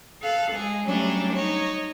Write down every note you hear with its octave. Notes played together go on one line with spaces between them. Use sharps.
A4 F5 F#6
G#3 G#4
F#3 G3 A3 C#4 D4
D#4 C#5